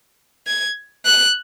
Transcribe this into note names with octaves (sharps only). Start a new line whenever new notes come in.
G#6
F#6